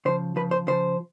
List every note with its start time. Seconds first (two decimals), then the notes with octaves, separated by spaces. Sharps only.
0.05 C#3 F3 C5
0.36 F3 B4
0.40 C#3
0.51 C5
0.67 C#3 F3 C5